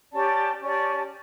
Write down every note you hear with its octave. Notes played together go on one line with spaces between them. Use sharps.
C#4 G4 D5 A5
C#4 G4 D5 A5